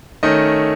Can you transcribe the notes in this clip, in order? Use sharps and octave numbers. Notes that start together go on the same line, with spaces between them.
D#3 A3 C#4 D#5